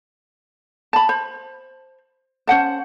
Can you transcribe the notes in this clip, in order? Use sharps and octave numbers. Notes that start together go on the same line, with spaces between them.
A5 B5
C5
C#4 C5 F#5 A5